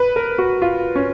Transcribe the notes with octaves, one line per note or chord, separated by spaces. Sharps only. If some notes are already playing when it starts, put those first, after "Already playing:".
Already playing: B4
A#4
F#4
F4
C#4